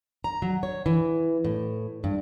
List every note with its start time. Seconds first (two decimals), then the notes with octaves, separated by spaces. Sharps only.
0.24 A#5
0.42 F#3
0.63 C#5
0.86 E3
1.45 A2
2.04 G2